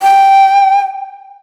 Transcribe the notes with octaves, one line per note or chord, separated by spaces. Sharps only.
G5